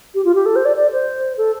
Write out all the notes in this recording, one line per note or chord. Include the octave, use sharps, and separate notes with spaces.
G4
F4
G4
A4
C5
D5
D5
C5
A4